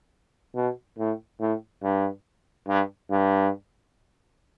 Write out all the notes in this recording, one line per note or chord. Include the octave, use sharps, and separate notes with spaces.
B2
A2
A2
G2
G2
G2